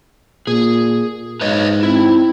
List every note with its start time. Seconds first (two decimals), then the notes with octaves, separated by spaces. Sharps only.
0.47 A#2 G#4
1.41 G#2 B4 C#5 D#5
1.83 C4 E4